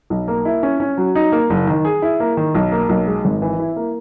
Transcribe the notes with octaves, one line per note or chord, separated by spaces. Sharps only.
B1
A#3
E4
C#4
C#4
F#3
D#4
A#3
F#1
D#3
G#4
E4
A#3
D#3
B1
A#3
B1
G#3
G#1
E3
E4
A#3